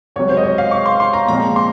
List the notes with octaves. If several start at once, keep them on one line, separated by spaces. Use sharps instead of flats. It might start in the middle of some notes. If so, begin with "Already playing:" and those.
C#2 C3 F#3 C#5
C5
D#5
C#5
F5
C#6
C6
C6
A#5
A#2 F3 G#3 C4 A#5
C6